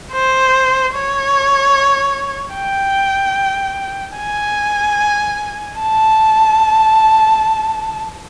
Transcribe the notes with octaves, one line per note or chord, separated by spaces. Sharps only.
C5
C#5
G5
G#5
A5